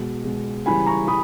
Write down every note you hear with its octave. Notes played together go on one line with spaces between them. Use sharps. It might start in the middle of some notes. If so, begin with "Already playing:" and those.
Already playing: B2 G#3
B2 G#3
C#3 E3 G3 G#5 B5
A#5 C#6
C#3 E3 G3 B5 D#6